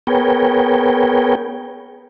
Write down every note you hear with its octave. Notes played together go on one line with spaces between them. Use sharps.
B3 G#4 A#4 B4 C#5 G5